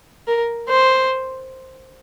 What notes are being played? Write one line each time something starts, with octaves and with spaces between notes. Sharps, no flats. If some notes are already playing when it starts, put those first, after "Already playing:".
A#4
C5